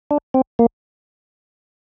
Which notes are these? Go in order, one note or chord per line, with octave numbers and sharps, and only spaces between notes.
D4
C4
A#3